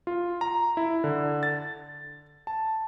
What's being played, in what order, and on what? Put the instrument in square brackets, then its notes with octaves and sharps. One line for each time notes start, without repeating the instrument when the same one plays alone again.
[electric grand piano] F4
A#5
E4
D3
A6
A5